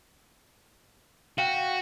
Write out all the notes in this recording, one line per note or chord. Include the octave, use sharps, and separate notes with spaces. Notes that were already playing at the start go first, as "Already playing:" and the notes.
F#4 F5 G5